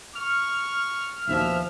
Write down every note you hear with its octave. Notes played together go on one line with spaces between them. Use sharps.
C#6 F6
A#1 D#2 B2 F3 E5